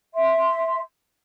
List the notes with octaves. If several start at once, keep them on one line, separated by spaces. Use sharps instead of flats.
E5 C6